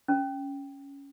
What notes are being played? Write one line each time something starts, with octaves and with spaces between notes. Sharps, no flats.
C#4